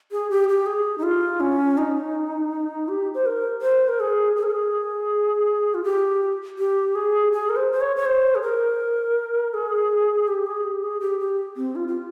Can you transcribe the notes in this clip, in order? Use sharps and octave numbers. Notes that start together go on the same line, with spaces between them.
G#4
G4
G4
G#4
D#4
F4
C#4
D#4
G4
C5
A#4
C5
A#4
G#4
G#4
A#4
G#4
F4
G4
G4
G#4
G#4
A#4
C5
C5
C#5
C#5
C5
G#4
A#4
G#4
G4
G#4
G4
G#4
G4
G4
C4
F4
F4